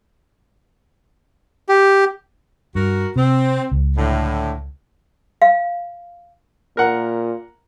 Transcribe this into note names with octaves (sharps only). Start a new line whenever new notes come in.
G4
G2 F#4 A#4
C3 C4
C#2
A2 D3
F5
A#2 A#4 F#5